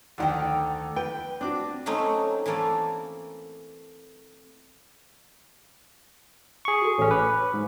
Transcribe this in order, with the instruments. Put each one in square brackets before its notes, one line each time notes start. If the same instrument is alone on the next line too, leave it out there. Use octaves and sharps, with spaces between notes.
[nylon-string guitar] D2 F#5 G5 [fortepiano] D3 D#3
[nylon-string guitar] B4 [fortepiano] G5
[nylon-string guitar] C4 F#4 [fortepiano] D4 D6
[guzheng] F#3 A3 C4 C#4 D#4
E3 A3 A#3 A4 D5
[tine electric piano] G#4 C#6
[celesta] F#4 A4
[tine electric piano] A1 C#4 [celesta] C#5 G#5
[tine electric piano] B4 [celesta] D6
[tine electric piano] G#2